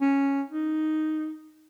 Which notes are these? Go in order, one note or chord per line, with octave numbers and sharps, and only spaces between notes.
C#4
D#4